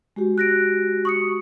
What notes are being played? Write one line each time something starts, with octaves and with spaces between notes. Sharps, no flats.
G#3 F#4 G4
F#6 A#6 D7
C#6 D#6 C#7